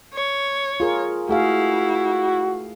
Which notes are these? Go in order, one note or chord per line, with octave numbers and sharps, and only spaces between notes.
C#5
F4 G#4 A#4
A3 E4 F#4 G#4 F5